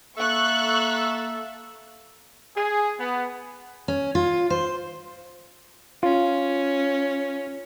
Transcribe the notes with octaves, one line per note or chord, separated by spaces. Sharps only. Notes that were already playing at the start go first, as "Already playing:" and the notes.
A#3 A4 E5 C#6 F#6
G#4
B3
C#4
F4
C5
C#4 F4